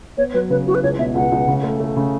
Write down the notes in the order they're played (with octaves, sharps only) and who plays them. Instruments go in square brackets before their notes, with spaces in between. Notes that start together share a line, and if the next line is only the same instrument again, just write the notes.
[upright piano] B3 [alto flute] C#5
[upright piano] F#3 [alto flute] B4
[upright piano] C#3 [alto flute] B4
[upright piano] E4 [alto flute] F#4
[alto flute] B4
[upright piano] C#2 [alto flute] C#5
[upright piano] B2 [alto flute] E5
[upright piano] C#2 [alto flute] F#5
[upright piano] C#2
C#3
A3
A3
C#3